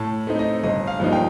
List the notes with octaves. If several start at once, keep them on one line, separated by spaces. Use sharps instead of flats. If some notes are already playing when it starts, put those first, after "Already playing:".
Already playing: A2 A5
A3 C4 D#4
D#5
G1 D#5
F5
G2 F3 A#3 D#4
G5